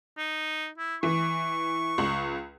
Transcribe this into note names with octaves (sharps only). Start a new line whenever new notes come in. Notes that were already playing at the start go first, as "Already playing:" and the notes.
D#4
E4
E3 C#6
C#2 F#7